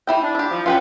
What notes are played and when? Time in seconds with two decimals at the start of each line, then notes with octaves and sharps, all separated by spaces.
0.07 E3 E4 G5
0.21 D4
0.35 E4 G4
0.50 F3
0.66 C#4 F4 B4 F#5 G5